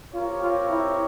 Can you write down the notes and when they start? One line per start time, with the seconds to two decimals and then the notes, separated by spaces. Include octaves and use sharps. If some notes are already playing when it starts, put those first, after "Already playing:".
0.13 C4 F4 G4 A#4 C#5
0.41 F4
0.70 E4